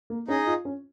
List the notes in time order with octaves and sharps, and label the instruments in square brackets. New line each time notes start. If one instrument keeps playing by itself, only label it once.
[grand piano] A#3
[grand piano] C#4 [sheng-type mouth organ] D#4 G#4 D#5
[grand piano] F4
C#4